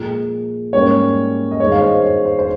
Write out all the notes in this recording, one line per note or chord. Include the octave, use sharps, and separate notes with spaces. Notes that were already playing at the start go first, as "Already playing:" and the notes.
Already playing: A#2 F3 G#3
G#2 G3 A#3 C#4 C#5
D#5
G2 D#3 G#3 C#5
F5
C5 D#5
C#5
C5
C5